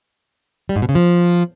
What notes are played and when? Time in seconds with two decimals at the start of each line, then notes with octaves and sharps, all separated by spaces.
0.69 G3
0.76 G#2
0.82 B2
0.89 C#3
0.95 F3